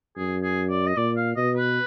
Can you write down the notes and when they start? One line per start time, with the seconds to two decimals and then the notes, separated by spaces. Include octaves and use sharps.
0.17 F#2 G#4
0.43 G#4
0.70 D5
0.86 D#5
0.97 A#2 D5
1.17 F5
1.36 B2 D#5
1.57 B4